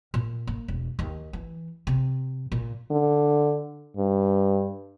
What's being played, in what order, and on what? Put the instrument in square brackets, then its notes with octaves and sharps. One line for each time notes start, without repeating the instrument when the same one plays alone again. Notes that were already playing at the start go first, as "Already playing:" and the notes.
[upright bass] A#2
A#3
E1
D#2
E3
C3
A#2
[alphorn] D3
G2